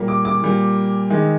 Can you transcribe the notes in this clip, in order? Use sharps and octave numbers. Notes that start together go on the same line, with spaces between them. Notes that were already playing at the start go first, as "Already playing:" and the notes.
Already playing: A#2 G3 A#3
D6
D6
A#2 G3 A#3
D#3 G#3